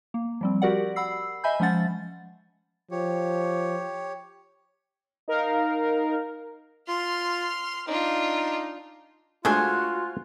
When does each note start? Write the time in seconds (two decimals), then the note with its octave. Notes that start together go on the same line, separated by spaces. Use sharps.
0.14 A#3
0.41 F3 G3 C4
0.62 F#4 G4 A#4 D5 F#5
0.96 F#5 B5 E6 C7
1.44 D#5 E5 G#5 B5 G6
1.60 F3 G#3 C#4 F#5 A6
2.91 F3 G4 C#5
5.28 D#4 A#4 F5
6.88 F4 C6 F6
7.88 D4 D#4 F4
9.45 G#3 A3 D4 F4 F#4 C5 G#5